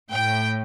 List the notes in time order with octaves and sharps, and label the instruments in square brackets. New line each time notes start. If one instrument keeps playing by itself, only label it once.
[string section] A2 G5